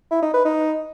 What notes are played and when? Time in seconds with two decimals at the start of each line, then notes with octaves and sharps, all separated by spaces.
0.11 E4
0.22 D#4
0.34 B4
0.45 D#4